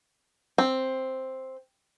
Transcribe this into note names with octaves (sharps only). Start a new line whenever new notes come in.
C4